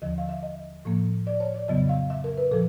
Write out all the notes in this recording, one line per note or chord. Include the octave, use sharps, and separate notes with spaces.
D#2 D3 F3 D#5
F5
E5
D#5
A2 F3 A#3
D5
C#5
D5
F2 C#3 F#3 B3 D#5
F5
E5
A#4
B4
A#2 F3 A4